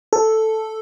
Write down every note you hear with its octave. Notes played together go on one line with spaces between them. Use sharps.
A4